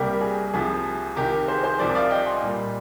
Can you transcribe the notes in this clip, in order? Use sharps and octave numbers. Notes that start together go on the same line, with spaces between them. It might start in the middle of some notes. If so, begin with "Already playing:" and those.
Already playing: C2 C3 G3 A#3 G4 A#4
G#4
C2 C3 F3 G#4
C2 C3 D#3 G4 A#4
G#4 C5
G#4 C5
C2 C3 F3 A#4 D5
D5 F5
D#5 G5
G#5 C6
A#2 G3 A#3